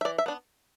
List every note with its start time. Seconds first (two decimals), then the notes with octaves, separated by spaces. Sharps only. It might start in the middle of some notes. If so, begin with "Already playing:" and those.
0.01 E5
0.05 E3 D5
0.18 E5
0.26 B3 D4